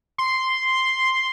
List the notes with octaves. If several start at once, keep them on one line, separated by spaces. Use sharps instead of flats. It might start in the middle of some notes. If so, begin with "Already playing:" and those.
C6